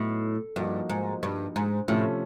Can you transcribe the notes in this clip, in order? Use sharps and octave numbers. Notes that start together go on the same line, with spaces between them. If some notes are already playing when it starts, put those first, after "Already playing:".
Already playing: A2 F#3 B3 D#4
G2 F3 A#3 D#4 F#4
G#2
G2
G#2
A2 C3 F3 A3 C#4 F4